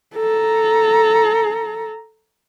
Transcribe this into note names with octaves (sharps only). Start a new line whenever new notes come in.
A4 A#5